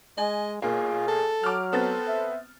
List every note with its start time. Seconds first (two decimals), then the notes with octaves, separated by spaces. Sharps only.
0.18 G#3 D#5 G#5
0.62 B1 A#3 F4 G#4
1.08 A4
1.43 F#3 D6 F6
1.73 B3 C4 A4 A6
2.08 E5